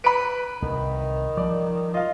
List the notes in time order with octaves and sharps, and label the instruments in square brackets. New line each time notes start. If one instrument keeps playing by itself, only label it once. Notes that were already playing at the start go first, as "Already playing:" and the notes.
[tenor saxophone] B4 [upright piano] B5 D7
[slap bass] C2 [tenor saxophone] D#3
[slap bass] F3 G3 [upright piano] D5
[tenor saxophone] F4 [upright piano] D#5 F5